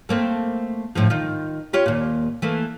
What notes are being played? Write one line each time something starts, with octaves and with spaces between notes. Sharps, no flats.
A3 A#3 C4
A2 D3 F3
D#3 F4
C#4 F4 G4
D#2 A#2
E3 A3 A#3